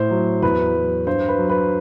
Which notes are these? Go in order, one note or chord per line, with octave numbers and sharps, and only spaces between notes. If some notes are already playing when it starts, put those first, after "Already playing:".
Already playing: A2 C5
F#3
E2 B4
F#3
G2 C5
B4
F#3
B4